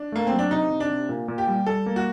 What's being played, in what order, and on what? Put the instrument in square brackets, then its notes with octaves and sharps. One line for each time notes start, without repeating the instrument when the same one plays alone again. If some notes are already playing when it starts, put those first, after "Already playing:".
Already playing: [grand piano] D4
[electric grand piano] A3 [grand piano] A#3
[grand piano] C4
[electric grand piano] F#3
[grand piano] D4
[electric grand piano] C3 [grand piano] D#4
[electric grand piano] C3
[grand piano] D4
[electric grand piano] C3
A#2
A#2
[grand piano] G4
[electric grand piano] G3
[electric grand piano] G3 [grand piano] A4
[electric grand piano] A#3
[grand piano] F#4